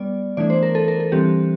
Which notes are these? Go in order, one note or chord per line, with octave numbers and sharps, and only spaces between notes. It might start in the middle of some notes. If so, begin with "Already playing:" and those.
Already playing: G3 B3 D5
E3 A3 D4 D5
C5
A#4
A4
A#4
A4
E3 G3 C4 G4